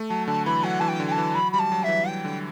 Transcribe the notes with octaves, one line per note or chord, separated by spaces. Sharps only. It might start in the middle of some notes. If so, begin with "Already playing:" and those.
Already playing: A3
F#3 A5
D3 A5
E3 B5
F#3 F#5
E3 A5
G5
D3
G5
A5
E3
F#3 B5
G3 B5
A5
F#3
E5
E3
G5
D3